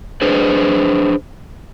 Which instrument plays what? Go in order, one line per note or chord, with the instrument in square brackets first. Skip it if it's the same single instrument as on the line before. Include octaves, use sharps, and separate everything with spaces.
[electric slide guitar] D4 G#4 B4 C5